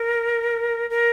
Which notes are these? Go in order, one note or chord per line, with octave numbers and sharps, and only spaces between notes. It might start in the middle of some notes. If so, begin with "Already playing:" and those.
Already playing: A#4
A#4